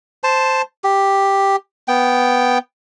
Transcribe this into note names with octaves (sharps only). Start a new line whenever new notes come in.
C5 A5
G4
B3 G5